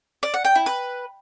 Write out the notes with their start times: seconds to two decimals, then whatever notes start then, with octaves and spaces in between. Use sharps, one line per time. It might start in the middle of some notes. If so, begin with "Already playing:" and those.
0.23 D5
0.34 F#5
0.44 G5
0.55 E4
0.66 B4